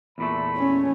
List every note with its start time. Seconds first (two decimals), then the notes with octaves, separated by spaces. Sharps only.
0.18 E2 A#2 A3 B5
0.57 C#4